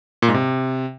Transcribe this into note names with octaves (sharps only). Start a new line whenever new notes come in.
A#2
G#2
C3